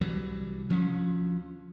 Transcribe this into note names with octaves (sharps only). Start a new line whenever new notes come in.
C2 E3 F#3 G3
D2 F3 B3 C#4